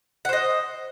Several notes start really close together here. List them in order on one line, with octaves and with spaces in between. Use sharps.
F#5 C5 D#5